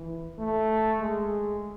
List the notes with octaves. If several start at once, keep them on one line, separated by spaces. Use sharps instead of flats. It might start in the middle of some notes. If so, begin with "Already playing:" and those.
Already playing: E3
A3
G#3